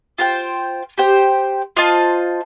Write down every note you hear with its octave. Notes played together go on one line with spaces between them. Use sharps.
F4 C5 G5
G4 C5 G5
F4 C5 D#5 A5